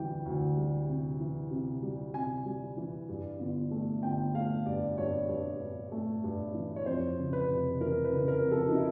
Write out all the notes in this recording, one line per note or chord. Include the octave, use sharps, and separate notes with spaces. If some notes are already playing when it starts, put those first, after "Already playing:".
Already playing: D2 E3 G3 G5
D2
G3
C3
E3
C3
G3
C3 G#5
G3
E3
G2
G1
A3
G1 G5
A3 F5
G2 D5
G2 C#5
G2
G2
A3
G2
E3
C#5
F2 C5
C#3
B4
F1
E3 A#4
B4
C#3
A#4
F2
A4
D#4
E4